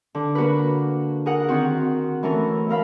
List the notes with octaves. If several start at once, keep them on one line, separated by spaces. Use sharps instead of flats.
D3
A#3 F#4 A#4 B4
G#4 A#4 F#5
D#3 C4 F#4
E3 A3 C#4 A#4
A3 A#4 F5 B5